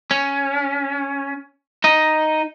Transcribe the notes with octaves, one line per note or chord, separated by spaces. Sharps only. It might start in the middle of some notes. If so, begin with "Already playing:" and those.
C#4
D#4 D#5